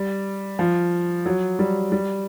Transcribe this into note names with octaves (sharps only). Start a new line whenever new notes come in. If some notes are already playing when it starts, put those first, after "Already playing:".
Already playing: G3
F3
F#3
G3
G3